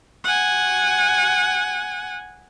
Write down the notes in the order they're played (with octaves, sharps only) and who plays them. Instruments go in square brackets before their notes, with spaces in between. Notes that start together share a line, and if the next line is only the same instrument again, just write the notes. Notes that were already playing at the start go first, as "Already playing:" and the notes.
[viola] F#5 G#5